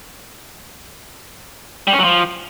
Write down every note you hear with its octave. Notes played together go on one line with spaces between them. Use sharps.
G3
C#4
F#3
F3